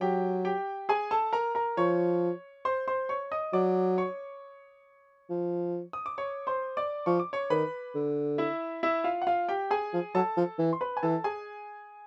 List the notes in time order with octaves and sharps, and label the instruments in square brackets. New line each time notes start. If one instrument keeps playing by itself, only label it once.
[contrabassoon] F#3 [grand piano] G4 G5
[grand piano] G4 G5
G#4 G#5
A4 A5
A#4 A#5
A#4 A#5
[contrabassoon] F3 [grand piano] C#5 C#6
[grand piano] C5 C6
C5 C6
C#5 C#6
D#5 D#6
[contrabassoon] F#3 [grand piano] D5 D6
[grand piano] C#5 C#6
[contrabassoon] F3
[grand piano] D#6
D6
C#5 C#6
C5 C6
D5 D6
[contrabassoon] F3 [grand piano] C#6
[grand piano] D6
C#5 C#6
[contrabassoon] D#3 [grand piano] B4 B5
[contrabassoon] D3
[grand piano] E4 E5
E4 E5
F4 F5
F#5
F4 F5
G4 G5
G#4 G#5
[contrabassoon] F3
[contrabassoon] F#3 [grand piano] A4 A5
[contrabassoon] F3
E3
[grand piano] C6
B4 B5
G#5
[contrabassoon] E3 [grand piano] A4 A5
[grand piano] G#4 G#5